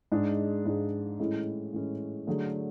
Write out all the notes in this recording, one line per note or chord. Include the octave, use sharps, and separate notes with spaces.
G#2 G#3 D4 G#4
G#2 G#3 D4 G#4
A2 E3 G#3 C#4 E4
A2 E3 G#3 C#4 E4
D3 F#3 A3 D4 G#4